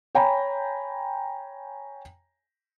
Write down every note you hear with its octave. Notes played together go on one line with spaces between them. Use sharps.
C#5 G5 G#5 A#5 B5